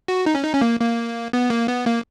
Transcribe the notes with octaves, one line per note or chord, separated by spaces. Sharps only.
F#4
D#4
C#4
D#4
C#4
A#3
A#3
B3
A#3
B3
A#3